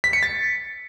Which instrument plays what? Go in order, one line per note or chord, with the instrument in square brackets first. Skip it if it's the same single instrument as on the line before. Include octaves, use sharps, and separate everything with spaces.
[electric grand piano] B6
C#7
A6